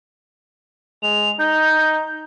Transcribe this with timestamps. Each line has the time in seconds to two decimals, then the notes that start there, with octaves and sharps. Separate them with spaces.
1.03 G#3 F7
1.39 D#4 G6